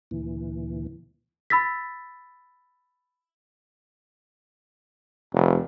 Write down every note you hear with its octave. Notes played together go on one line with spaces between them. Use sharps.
D2 A#2 E3
B5 E6 A6 B6
F1